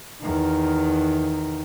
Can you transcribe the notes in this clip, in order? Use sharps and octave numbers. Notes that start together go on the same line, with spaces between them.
E2 D#3